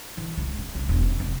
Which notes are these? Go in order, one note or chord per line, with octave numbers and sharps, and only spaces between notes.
E3
C#2
C#3
C2
E1
C#3
F1